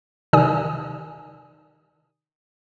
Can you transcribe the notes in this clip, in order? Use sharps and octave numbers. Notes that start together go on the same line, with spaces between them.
C3 D#3 D#4 D5 G#5 D#6